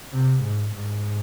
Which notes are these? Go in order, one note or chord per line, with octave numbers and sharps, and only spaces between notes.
C3
G#2
G#2